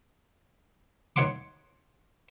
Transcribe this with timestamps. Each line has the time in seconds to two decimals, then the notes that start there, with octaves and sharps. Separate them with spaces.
1.16 D#4 C#5 F#5 C6 D6